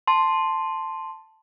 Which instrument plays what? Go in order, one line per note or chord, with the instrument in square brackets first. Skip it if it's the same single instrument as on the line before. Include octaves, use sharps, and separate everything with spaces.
[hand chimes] A5 C6